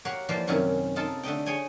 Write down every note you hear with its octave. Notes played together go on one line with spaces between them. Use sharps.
F#4 G4 A#4 C#5 F5 F#5
E3 F3 A#3 F4 C5 D5
F#2 C3 D#3 F#3 C#4
D#4 F4 A4 A#4 A5
D3 A3 D#5 G5
G#4 C#5 G5 G#5